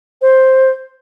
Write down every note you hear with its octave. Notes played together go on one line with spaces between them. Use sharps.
C5